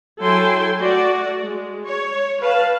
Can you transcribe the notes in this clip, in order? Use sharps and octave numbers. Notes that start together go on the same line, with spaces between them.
F#3 E4 A4 G5 G#5 C6
A3 F#4 D5
G#3
C#5
B4 F5 A5